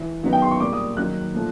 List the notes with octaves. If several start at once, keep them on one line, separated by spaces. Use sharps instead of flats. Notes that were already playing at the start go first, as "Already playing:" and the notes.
Already playing: E3
D#3 F#3 B3 D#4
G5
C6
C#6
A#2 G3 A#3 D6
D#6
D#3 F#3 A#3 D#4 F#6
A#2 F3 A3